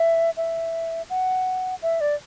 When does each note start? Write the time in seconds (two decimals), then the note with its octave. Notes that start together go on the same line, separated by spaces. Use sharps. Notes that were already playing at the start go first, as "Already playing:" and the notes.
Already playing: E5
0.37 E5
1.10 F#5
1.82 E5
2.01 D5